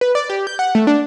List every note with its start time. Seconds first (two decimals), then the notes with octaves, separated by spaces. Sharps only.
0.01 B4
0.15 D5
0.30 G4
0.47 G6
0.59 F#5
0.75 A3
0.87 D4